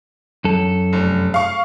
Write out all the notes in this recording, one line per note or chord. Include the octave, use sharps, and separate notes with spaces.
F#2 A4
F1
F5 C#6